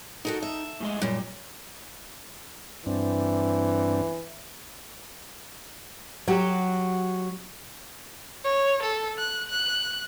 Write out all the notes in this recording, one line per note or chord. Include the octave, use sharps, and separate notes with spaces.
D#4 F#4 A4 A#4
E5
A2 G#3 D#5
F#2 A#2 G3
G2 E3 C4 D4
F#3 F#4 G4
C#5
A4
F#6
F#6